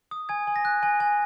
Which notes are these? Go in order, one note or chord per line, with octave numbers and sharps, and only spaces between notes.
D#6
G#5 G#6
G#5
A#6
F#6
G#5
G#5